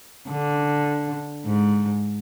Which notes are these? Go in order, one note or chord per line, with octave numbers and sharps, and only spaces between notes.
D3
G#2